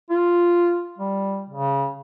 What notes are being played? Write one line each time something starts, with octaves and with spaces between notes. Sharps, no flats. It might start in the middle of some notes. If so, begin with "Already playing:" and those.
F4
G3
C#3